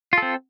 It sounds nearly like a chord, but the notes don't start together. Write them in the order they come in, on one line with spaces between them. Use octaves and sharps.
F4 A4 C4